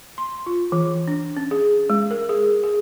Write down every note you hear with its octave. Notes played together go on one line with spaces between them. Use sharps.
C6
F4
E3
D4
C#4
G#4
G#3
A#4
G#4
G#4